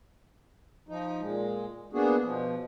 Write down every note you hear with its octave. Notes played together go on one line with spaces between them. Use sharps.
F3 D#4
A#2 G#3
A#3 B3 D4 F#4 G#4
B2 F3